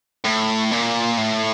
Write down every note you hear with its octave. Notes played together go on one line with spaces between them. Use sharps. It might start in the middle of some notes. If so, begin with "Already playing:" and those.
A2
A#2
A2